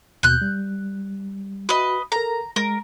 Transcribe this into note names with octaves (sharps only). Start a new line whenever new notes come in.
D#2 B2 F#6 G6
G3
F#4 B4 D#5
A4 A#4 A#5
G#3 A#4